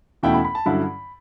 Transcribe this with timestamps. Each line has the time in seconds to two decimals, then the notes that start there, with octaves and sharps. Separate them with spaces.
0.23 E2 B2 A3 C#4 E4 G5
0.34 B5
0.45 B5
0.55 A5
0.66 G2 D3 F#3 C#4 E4 B5